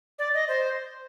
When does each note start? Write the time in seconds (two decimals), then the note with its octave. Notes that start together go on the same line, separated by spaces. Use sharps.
0.19 D5
0.34 D#5
0.48 C5